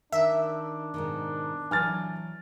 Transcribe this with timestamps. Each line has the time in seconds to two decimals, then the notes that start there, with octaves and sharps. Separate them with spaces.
0.12 D#3 D4 E5
0.94 G#2 B2 D#3
1.71 E3 F#3 G#5 F6 A6